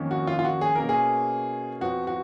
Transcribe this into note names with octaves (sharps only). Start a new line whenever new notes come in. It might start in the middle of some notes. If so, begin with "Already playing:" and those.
Already playing: F2 D#3 A#3 C#4
F#4
F4
F4
F#4
G#4
B2 A#3 C#4 A#4
G#4
F2 F3 B3 F#4
F#4